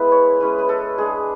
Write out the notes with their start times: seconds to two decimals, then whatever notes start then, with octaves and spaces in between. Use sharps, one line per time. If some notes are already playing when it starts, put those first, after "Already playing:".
Already playing: G#3 B3 E4 B4
0.12 C#5
0.40 G#3 C#4 E4 B4
0.58 B4
0.69 A4
0.98 G#3 D4 G#4